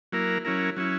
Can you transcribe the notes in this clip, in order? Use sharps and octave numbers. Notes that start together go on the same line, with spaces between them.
F#3 A#3 E4 A#4
F#3 C#4 E4 A#4
F#3 C#4 E4